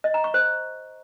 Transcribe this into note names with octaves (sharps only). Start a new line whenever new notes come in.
D#5
A#5
C#6
C5